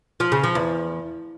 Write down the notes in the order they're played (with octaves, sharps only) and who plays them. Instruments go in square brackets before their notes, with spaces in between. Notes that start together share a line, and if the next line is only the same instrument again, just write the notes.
[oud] F3
C#3
F3
E2